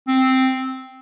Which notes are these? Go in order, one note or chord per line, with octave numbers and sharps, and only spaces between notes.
C4